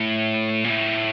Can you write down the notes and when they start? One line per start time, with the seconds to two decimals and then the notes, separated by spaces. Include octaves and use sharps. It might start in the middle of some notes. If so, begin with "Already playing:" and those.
Already playing: A2
0.65 A#2
0.70 A2